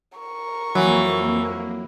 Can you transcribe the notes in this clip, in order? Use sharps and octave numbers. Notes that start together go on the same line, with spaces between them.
A#4 C#6
F2 E3 F#3 A#3